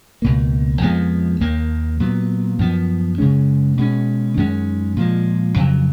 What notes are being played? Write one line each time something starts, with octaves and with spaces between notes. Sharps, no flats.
C#2 B2 A#3
F2 F3 G#3 B3
D#2 D#3 A#3
A#2 F#3 B3
F#2 F3 B3
F#2 C#3 G#3 C#4
B2 G#3 C#4
F#2 D#3 G#3 C#4
A#2 F3 G#3
F2 C#3 F#3